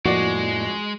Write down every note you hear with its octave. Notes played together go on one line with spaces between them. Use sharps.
F2 A2 F3 G#3 A#3 E4 F#4 D5